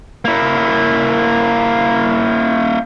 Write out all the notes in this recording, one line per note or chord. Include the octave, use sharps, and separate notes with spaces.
A#3 E4